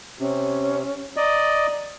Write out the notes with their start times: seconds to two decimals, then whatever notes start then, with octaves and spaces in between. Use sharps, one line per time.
0.19 C3 C#4
1.16 D5 D#5 A#5